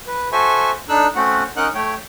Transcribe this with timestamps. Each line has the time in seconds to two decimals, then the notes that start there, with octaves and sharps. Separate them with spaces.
0.07 B4
0.32 F#4 A4 C5 E5 G#5 C#6
0.89 D4 D#4 A4 E6 F#6
1.16 A3 C4 C#4 F#4 F#5
1.57 C#4 D#4 A#4 D#5 F#5 F#6
1.75 A3 C#5 G5